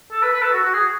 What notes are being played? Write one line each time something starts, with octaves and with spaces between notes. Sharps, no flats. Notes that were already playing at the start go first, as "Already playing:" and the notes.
A4
B4
B4
A4
F#4
F#4
G#4